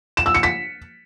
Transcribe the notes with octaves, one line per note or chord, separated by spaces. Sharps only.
E7
E6
C#7
B6